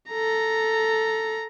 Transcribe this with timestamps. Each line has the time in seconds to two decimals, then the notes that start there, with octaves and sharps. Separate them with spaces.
0.10 A4 A#5